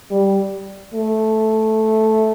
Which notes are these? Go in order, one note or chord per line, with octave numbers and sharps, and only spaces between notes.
G3
A3